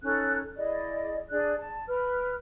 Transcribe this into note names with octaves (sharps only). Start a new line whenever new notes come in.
C#4 D#4 A4 F#6
E4 G#4 D5 D#5
D4 G#4 D5 F#6
A5
B4 F6